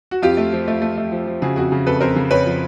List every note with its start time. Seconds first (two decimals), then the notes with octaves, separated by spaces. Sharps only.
0.11 F#4
0.22 F2 F4 G4
0.37 A3
0.53 F3
0.68 A3
0.82 A3
0.97 A3
1.12 F3
1.27 F3
1.42 C#3 F#4 G#4
1.56 F2 F#4 G#4
1.72 C#3
1.86 F2 A4 B4
2.01 F2 A#4 C5
2.16 C#3
2.31 F2 B4 C#5
2.46 F3